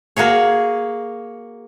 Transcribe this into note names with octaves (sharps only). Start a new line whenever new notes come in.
A#3 F#4 G#4 C#5